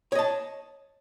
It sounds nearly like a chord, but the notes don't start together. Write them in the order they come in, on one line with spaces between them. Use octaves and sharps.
C#5 D#5 A5